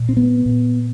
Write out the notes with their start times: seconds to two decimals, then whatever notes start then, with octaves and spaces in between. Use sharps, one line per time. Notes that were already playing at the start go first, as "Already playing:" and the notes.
Already playing: A#2
0.09 C4
0.17 B3
0.46 A#2